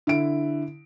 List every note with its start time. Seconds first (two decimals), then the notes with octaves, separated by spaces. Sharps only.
0.07 D3 E4 D7